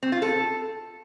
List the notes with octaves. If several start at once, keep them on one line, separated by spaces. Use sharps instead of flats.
C4
F4
A4